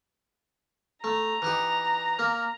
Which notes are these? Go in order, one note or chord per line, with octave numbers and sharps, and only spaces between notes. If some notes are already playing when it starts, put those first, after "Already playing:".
A3 A#5
E3 D#4 G4
A#3